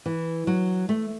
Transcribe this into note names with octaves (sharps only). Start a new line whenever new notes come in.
E3
F#3
A3